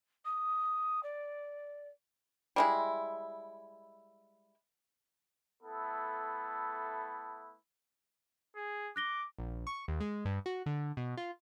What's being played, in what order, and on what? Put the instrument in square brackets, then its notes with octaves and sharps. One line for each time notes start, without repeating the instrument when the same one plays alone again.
[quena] D#6
D5
[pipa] G3 G#3 E4
[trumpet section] A3 B3 E4 A4
[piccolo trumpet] G#4
[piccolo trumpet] D6 [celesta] F#6 A#6 G7
[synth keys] A#1
C#6
D#2
G#3
G2
F#4
D3
B2
F4